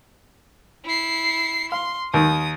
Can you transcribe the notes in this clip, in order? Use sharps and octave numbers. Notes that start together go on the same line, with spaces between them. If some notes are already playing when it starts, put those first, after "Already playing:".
E4 C7
F5 C6
D#2 D#3 D#6